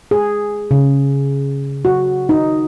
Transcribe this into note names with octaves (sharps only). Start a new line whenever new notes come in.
G#4
C#3
F#4
D#4